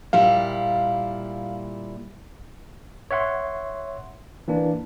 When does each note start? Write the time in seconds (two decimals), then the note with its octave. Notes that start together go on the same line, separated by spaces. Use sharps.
0.13 A#2 G3 E4 F5
3.11 C#5 E5 F#5 C6
4.48 E3 A#3 D4